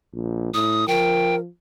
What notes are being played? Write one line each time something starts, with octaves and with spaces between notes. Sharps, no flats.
A#1
A2 D#6
F3 A#4 G5